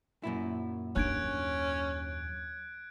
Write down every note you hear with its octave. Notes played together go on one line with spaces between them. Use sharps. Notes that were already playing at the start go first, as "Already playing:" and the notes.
F#2 A#2 E4
D#2 C#4 D4 F#6 G#6 D7